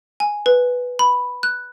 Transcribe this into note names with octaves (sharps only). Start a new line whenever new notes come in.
G#5
B4
B5
F#6